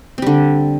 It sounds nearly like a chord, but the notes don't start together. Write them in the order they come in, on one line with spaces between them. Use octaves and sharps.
C4 G3 D3